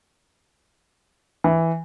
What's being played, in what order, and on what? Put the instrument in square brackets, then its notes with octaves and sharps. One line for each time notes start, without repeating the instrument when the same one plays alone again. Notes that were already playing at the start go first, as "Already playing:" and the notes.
[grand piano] E3